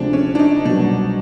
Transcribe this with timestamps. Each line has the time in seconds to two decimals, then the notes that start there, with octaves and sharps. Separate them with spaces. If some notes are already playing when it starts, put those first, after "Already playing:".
Already playing: D2 C3 F3 G#3 C4 D4
0.13 C#4
0.35 D4
0.39 D#4
0.65 C2 B2 F#3 D4